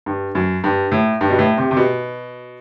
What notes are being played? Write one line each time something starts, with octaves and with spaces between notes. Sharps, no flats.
G2
F#2
G2
A2
G2
B2
A2
C3
C3
B2